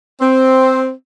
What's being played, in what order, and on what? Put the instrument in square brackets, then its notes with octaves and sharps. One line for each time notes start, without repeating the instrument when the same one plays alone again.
[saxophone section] C4